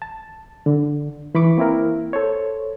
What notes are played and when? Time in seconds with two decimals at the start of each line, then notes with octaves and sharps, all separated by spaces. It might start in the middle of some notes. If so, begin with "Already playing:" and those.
0.02 A5
0.66 D3
1.35 E3 B5 C#6 D6
1.58 A#3 C4 E4 A#4
2.13 A4 C5 C#5